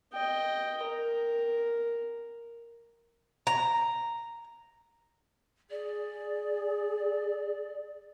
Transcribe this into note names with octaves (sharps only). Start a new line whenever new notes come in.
D#5 G5
A#4
A#5
G#4 D5